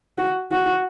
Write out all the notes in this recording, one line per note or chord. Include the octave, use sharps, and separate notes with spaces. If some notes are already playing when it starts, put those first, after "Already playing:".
F#4
F#4